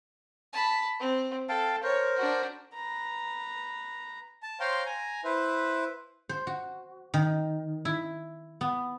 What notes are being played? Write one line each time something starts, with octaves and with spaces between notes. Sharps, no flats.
A5 B5
C4
A4 F5 G5 A5
A#4 C5 C#5
D4 F#4
B4 A#5
A5
C5 C#5 F5 G5 A#5 C6
G#5 A#5
E4 B4 C5
C5
F#4
D#3
E4
B3